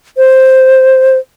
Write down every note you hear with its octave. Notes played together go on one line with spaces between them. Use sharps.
C5